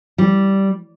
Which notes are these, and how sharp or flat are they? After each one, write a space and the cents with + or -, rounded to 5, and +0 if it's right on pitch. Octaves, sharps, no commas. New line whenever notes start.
G3 -10